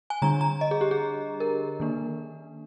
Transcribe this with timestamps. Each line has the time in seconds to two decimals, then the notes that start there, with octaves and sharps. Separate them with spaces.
0.10 G#5
0.22 D3 G3 D4 A#5
0.41 A#5
0.61 D#5
0.71 G#4
0.81 G4
0.91 G#4
1.40 A#4
1.80 D#3 A#3 D4